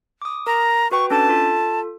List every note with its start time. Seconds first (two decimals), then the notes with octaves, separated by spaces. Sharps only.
0.22 D6 D#6
0.47 A#4 A#5
0.91 F#4 B4 G5 C#6
1.10 C#4 D4 A4 A5
1.29 F4 A4